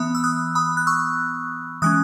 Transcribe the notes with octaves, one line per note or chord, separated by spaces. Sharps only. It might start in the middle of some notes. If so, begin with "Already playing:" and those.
Already playing: E3 B3 B5 D#6
E6
D#6 F#6
B5 D#6
F#6
C#6 E6
E3 G#3 C#4 D#6 F#6